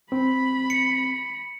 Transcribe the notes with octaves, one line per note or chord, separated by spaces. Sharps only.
C4 B5
C#7